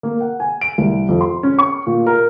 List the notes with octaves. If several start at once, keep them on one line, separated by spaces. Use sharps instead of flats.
A#3
F#5
G#5
D7
C2
F2
C6
C#4
C#6
A#2
A#4